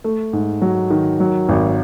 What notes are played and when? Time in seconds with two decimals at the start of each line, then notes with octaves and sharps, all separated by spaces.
0.04 A3
0.33 G#2
0.62 F#3
0.90 D#3
1.20 F#3
1.49 G#1